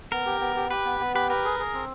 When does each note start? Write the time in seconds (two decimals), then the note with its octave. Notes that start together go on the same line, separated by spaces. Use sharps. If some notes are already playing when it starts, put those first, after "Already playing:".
0.12 B3 A#4
0.26 G4
0.41 B3
0.56 G4
0.70 G4 B4
0.85 B3
1.00 B3
1.14 G4 B4
1.30 A#4 B4
1.45 G#4
1.59 G#4
1.74 C4